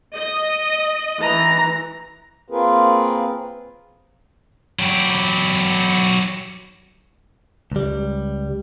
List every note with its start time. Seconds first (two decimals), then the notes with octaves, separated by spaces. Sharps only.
0.16 D#5
1.20 E3 A#5
2.50 A#3 C4 F4 G#4 A#4 B4
4.79 F#3 G4
7.72 C#2 G3